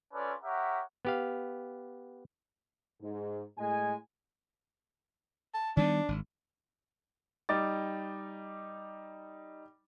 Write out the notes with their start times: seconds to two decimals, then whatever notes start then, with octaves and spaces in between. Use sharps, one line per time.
0.13 C4 C#4 F4 A4 B4 D5
0.44 G4 A#4 C#5 E5 F#5
1.05 B3 G4 F5
3.01 G#2
3.58 A2 G#3 G#5
5.54 A5
5.77 D#3 G3 B3 D4
6.08 G#1
7.49 G3 D#4 D6 A6